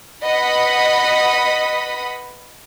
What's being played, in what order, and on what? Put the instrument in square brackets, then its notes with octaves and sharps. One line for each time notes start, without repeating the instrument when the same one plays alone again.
[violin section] B4 D#5 F#5 B5 D#6 B6